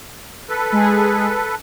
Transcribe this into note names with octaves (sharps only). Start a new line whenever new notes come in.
A4 B4
G#3 G#4